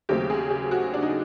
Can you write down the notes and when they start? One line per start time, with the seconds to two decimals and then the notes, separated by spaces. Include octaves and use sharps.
0.09 D#2 C#3 F#3 A3 C4 G4
0.30 G#4
0.50 G4
0.71 F#4
0.94 D4
1.02 D#4